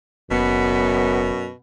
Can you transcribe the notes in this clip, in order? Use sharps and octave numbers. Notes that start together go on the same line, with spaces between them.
F#1 F#2 B2 B3